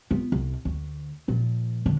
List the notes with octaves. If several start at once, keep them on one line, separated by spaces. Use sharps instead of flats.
B3 F4
C2
D2
A#2 F3
D3